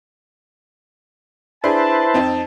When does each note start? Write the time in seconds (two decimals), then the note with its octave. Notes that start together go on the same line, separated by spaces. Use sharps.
1.64 D4 E4 G#4 B4 C5 A5
2.14 F2 C4 D#4